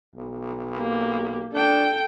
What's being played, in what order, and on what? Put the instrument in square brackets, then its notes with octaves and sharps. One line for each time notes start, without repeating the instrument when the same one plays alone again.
[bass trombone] B1
[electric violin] A#3 G4
[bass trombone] D4 [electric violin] A4 G5